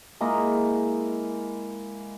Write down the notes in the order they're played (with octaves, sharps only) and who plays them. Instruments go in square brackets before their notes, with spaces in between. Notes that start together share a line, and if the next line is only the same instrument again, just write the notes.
[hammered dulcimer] G#3 A#3 E4 D#5